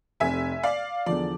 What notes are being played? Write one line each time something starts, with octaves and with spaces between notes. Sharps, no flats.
F1 F2 C3 E5 G#5
D5 F5
E2 D3 F3 D5